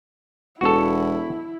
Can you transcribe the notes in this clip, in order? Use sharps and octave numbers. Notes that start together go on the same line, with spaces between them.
E1 E4 F#4 A4